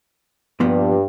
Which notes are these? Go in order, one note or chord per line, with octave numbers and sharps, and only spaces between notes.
G2 A#2 F3 B3